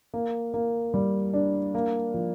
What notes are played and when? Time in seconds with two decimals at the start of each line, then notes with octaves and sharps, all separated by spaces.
0.14 A#3
0.54 A#3
0.94 G3
1.34 D4
1.75 A#3
2.14 F3